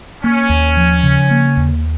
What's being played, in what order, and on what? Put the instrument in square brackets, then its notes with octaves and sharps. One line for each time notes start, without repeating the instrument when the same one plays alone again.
[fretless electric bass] A#3 [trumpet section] C#4
[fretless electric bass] D#2
F3
C#3
A#3
D#2